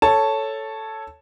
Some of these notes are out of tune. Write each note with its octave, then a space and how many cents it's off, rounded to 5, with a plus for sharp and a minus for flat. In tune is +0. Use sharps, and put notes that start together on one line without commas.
A4 +0 C#5 +0 A5 +0